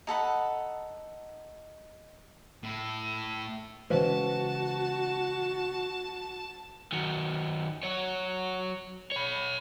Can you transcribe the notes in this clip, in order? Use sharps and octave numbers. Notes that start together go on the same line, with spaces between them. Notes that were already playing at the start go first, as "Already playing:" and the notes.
D#4 A4 F#5 B5
A2 E4
C#3 E3 G#3 F#4 B4 C5 F5 A5
D#3 F#3
F#3 C#5
C#5 B5